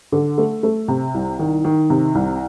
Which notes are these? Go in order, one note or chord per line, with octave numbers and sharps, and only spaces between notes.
D3
A3
A3
C3
C2
D#3
D#3
C3
C2